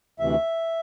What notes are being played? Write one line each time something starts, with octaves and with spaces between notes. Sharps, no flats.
D2 C3 E3 E5